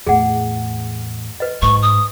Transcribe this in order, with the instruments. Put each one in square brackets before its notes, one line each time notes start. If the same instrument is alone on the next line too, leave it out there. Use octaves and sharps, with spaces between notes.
[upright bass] E2 A2 [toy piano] G#4 F#5
[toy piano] B4 D#5
[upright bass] G#2 [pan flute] C#6
[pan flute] D#6